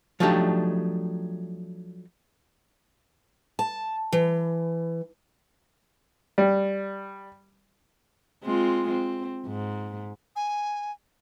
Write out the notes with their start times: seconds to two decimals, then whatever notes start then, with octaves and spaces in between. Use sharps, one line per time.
0.20 F3 F#3 A3 D4 D#4 G4
3.59 A5
4.13 E3
6.38 G3
8.44 G#3 C4 F4
8.89 C4
9.46 G#2
10.36 G#5